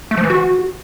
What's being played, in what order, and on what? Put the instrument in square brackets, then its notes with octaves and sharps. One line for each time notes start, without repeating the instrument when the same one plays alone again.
[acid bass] A3
F3
E3
F#4